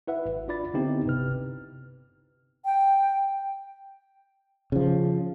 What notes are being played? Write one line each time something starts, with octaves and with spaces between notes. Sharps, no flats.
E4 B4 E5 F#5
G#1
D4 F4 D5 B5 A6
D3 B3 C4 D#4 E4 G4
G1 C3 B4 F6
G5
C#3 F3